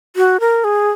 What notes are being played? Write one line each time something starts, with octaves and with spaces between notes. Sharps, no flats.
F#4
A#4
G#4